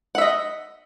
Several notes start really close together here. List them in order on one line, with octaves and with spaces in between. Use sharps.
F#5 E5 D#5